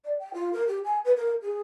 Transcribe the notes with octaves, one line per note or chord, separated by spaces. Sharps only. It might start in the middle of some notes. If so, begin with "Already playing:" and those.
D5
G5
F4
A#4
G4
G#5
B4
A#4
G#4